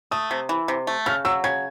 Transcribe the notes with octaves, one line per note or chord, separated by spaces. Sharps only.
A3 D#6
C3
E3
C3
A3
C#3 F6
F#3 E6
C#3 G#6